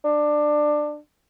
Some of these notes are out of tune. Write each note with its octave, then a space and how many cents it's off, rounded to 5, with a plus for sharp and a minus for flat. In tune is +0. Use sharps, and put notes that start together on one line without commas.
D4 +15